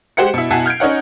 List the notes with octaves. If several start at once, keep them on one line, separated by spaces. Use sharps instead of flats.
G#3 G4 C5 F#5 C#7
B2 E4
B2 E4 F#5 G#5 A5 C7
F6 G6 G#6 D7
C#4 D#4 C#5 F#5